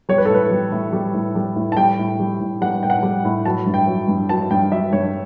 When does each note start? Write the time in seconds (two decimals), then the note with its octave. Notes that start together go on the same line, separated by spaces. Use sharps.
0.09 G3 C#5
0.18 B4
0.25 A4
0.30 A2 B4
0.51 G3
0.72 A2
0.93 G3
1.14 A2
1.35 G3
1.56 A2
1.72 A5
1.77 G3 G5
1.99 A2
2.20 G3
2.40 A2
2.61 G3 F#5
2.82 A2 G5
2.90 F#5
3.03 G3
3.25 A2
3.45 F#3 A5
3.66 G2
3.74 G5
3.87 F#3
4.08 G2
4.29 F#3 A5
4.50 G2 G5
4.71 F#3 E5
4.93 G2 C#5